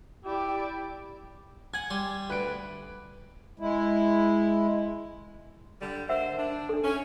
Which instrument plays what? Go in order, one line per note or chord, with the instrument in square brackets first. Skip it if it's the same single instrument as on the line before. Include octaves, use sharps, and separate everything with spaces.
[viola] E4 D5 [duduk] G4
[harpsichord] F#5 G#5 [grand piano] G#6
[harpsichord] G3 G#5 C6
[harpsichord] D2 [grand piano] B4 D7
[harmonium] G#3 E4
[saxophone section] D3 G3
[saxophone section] D3 A#3 C5 [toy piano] E5 F#5 E6
[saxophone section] D4
[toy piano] D4 A4
[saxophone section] C#4